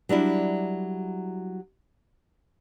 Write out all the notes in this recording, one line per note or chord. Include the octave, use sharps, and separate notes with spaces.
F#3 G3 D4 E4